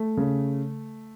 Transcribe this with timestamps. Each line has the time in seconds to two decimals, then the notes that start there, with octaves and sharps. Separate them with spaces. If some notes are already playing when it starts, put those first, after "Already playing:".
Already playing: A3
0.17 C#3